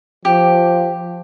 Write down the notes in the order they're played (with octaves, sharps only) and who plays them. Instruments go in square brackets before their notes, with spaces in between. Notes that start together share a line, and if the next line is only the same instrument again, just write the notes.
[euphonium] F3 [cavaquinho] G4